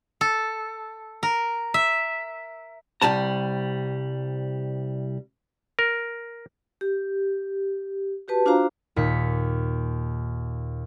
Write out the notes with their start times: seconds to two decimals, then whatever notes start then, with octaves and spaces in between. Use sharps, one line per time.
0.21 A4
1.23 A#4
1.74 E5
3.01 C2 F3 G3 A5 A#5
5.79 A#4
6.81 G4
8.28 F#4 G4 B4 A5
8.46 D4 F4 F#4 C5 F5 A#5
8.96 D#2 A#2 B6 C#7